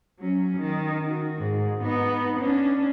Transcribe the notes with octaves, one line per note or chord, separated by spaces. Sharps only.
F#3 C#4
D#3
F#4
G#2
B3 D#4
C#4 D4